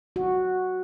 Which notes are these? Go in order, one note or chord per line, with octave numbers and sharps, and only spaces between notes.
F#4